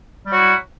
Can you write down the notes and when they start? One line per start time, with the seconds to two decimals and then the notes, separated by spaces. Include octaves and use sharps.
0.25 G3
0.29 F#3
0.33 F#4
0.37 E4